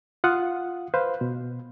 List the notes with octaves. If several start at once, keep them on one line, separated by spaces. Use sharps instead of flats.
F4 F5 F#5 D#6
B4 C5 F5
B2